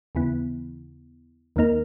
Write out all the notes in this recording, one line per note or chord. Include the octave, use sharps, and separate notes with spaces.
D#2 C#3 E3 B3 E4
D#2 D#3 A#3 D#4 A#4